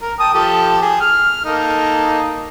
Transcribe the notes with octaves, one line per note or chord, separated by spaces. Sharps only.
A#4
G5 A5 D#6
F3 G4 A4
G#4
F6
A#3 D#4 A4